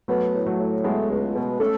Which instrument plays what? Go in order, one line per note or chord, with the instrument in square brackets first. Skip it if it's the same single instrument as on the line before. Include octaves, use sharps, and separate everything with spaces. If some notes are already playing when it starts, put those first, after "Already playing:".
[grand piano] F#3 A3 [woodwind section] B3
[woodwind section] A2
[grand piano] F#3 A3
[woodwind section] A2
[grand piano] G#3 B3 [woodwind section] A3
[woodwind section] C#2
B2
[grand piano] A3 C#4 [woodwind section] A4